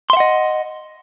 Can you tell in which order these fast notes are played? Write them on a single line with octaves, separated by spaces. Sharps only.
C6 E5 F#5 D#5